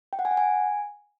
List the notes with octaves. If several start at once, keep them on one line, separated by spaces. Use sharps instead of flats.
G5
F#5
G#5
F#5
G#5